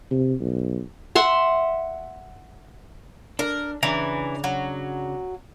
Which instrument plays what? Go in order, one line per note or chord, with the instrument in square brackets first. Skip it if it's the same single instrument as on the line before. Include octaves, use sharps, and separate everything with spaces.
[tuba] C3
B1
[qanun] E5 F#5 C6
[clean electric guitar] D4 [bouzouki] A#4
[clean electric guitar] C#3 D4 A#5 [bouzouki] E3
[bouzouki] F#3